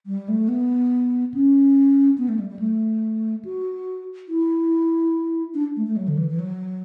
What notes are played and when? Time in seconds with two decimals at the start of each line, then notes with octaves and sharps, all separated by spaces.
0.06 G3
0.28 A3
0.49 B3
1.34 C#4
2.18 B3
2.29 A3
2.39 G3
2.49 G3
2.59 A3
3.45 F#4
4.29 E4
5.55 D4
5.76 A3
5.87 A3
5.97 F#3
6.08 D3
6.18 E3
6.29 E3
6.39 F#3